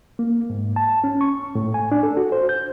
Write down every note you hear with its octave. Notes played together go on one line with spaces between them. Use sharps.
A#3
G#2
A5
C#4
C#6
A2
G#5
D4
A4
F#4
C5
G6